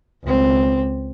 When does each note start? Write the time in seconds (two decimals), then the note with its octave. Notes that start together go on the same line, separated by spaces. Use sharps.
0.23 C#2 C4